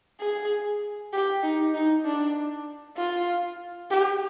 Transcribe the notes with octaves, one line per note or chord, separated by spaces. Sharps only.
G#4
G4
D#4
D#4
D4
F4
G4